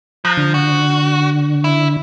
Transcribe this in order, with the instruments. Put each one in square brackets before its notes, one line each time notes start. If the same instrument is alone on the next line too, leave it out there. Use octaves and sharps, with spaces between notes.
[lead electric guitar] F3 [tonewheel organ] A#5 F#6
[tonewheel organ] D3
[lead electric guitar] F#4
E4